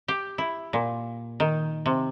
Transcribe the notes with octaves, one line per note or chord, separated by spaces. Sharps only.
G4
E4
A#2
D#3
C3